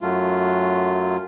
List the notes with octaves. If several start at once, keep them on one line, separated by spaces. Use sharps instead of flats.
F#2 F#3 A3 F4